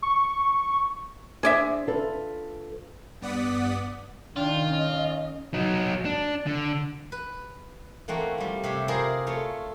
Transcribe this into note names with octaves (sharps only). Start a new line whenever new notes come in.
C#6
D4 G#4 C5 D5 E5
F4 A4 B4
G2 B3 D5 F#5 D#6 B6
D#3 D4 F4 G5
C#4 D#5
F#3 D#4
D4
D3
B4
E3 A3 A#3 C4 F#4
G3 F4
C3 G4 C#5 E5
E4 F4 G#4 A#4 C5 D5
A3 F4 A4 C#5